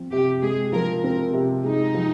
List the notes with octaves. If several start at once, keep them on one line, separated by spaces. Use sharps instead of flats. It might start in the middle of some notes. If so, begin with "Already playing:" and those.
Already playing: F3 C4
C3 G4
G#3 G#4
F3 A#4
C4 A#4
C3
G#3 D#4
F3